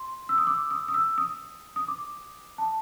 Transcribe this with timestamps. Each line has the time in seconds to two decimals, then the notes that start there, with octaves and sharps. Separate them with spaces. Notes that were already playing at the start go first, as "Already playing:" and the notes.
Already playing: C6
0.29 E6
0.38 D#6
0.47 D6
0.71 D#6
0.88 D#6
0.94 E6
1.18 D#6
1.76 D#6
1.88 D6
2.58 A5